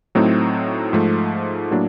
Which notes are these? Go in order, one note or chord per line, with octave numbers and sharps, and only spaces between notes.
A2 F#3 A3 C4 D#4
G#2 F3 A3
A2 F#3 A#3 D4